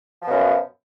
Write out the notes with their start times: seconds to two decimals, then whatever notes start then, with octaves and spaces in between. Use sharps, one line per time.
0.22 F3
0.26 B2
0.30 F#2